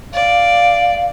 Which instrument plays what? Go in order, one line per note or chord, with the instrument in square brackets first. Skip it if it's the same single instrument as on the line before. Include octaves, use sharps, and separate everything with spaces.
[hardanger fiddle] D5 [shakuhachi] F5